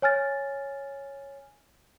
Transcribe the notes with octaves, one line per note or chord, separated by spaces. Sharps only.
C#5 G#5 F6 A6